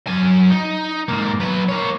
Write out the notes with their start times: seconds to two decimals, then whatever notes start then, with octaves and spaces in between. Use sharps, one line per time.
0.07 F#3 G#5
0.51 D#4
1.08 G#2 A#3
1.40 F#3 B4
1.69 A#3 C#5